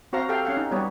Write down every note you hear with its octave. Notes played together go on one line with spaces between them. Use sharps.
C4 F#4 C5 F5 A#5
G4 A4 F5 G5
C#4 F5 F#5
D#4
G3 B3 G4 C#5